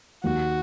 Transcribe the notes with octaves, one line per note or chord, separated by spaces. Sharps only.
D#2 F#4